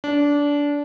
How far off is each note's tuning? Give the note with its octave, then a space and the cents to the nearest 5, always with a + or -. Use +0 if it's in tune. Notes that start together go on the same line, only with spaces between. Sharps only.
D4 -20